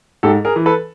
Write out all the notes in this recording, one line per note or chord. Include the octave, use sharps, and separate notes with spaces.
G#2 G4 A4
G#4 A#4
E3
A4 B4